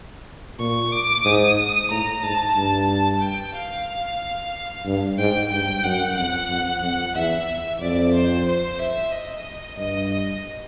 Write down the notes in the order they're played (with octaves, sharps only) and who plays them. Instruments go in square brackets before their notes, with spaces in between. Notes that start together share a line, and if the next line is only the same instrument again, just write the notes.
[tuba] A#2 [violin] C#6
[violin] D6
[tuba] G#2 [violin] D#6
[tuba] A2 [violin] A#5
[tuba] G#2 [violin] A5
[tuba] G2 [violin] A5
[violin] G5
F5
[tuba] G2
[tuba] G#2 [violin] G5
[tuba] G2 [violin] G5
[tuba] F#2 [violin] F#5
[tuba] F2 [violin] F#5
[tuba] F2
F2
[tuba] E2 [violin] E5
[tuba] F2 [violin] D5
[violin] C5
C5
E5
D#5
[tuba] G2 [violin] D#5